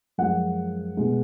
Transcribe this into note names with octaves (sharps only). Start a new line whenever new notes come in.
F#2 F3 G#3 F#5
B2 G#3